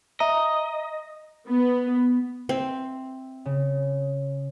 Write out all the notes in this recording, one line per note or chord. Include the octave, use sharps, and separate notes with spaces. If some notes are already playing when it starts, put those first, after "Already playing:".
D#5 E5 A#5
B3
C4 E5
C#3